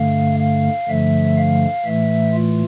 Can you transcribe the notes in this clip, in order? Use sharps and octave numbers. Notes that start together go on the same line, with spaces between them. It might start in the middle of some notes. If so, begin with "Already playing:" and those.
Already playing: G2 D3 A3 F5
F5
G2 D3 F3 A3 E5
F5
A2 E3 A3 E5
F4